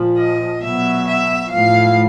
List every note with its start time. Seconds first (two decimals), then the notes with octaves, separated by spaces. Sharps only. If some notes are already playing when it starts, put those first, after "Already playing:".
Already playing: A#2 F3
0.20 D#5
0.63 B2 F#3 E5
1.08 E5
1.51 A2 F3 F5